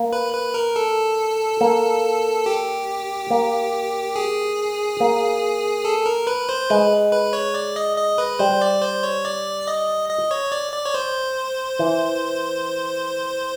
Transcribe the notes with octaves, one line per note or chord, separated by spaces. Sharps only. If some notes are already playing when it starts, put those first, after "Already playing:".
Already playing: A#3
B4
B4
A#4
A4
A#3
G4
A#3
G#4
A#3
A4
A#4
B4
C5
G#3 B4
B4
C#5
D5
D#5
D#5
B4
G3 C5
D5
C5
C#5
D5
D#5
D#5
C#5
D5
D5
C#5
C5
E3